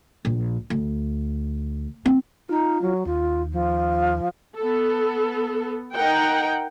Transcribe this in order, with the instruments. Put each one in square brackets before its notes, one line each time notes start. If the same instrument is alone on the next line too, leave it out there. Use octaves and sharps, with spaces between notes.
[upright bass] A#1
D2
C4
[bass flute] D#4 [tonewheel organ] F4
[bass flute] F#3
[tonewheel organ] D#2 [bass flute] F4
[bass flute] F3
[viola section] B3 A4
D#4 A#4 F#5 G5